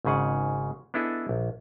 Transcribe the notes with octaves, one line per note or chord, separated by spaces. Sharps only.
G#1 G#2 C#3 G#4 F#5
B3 D4 E4 G#4 A4 D#5
A#1